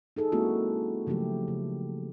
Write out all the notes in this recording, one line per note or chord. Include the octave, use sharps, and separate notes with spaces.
D#4 G#4 A4
G#3 A#3 C4 C#4 E4 F#4
C#3 F3 F#3 A3 G4
C#3